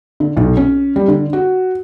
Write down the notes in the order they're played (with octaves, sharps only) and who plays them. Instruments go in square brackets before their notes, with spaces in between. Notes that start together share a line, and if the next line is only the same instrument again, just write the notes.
[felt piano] D3
B1
C#4
G3
D3
F#4